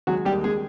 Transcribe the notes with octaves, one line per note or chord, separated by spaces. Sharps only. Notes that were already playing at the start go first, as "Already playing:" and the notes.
F#3 G#3 F#4
G3 G4
D#2
G#3 G#4